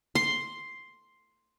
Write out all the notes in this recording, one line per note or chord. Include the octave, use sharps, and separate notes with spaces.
C6